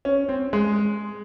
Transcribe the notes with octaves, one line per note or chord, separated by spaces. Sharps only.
C#4
C4
G#3